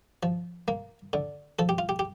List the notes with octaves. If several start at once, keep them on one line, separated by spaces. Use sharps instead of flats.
F3
A#3
D3
F3 A4
G4
F4
G4
G4